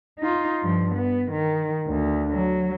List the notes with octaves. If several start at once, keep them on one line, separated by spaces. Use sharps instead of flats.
D#4 F4
G2 F3
B3
D#3
D2
F#3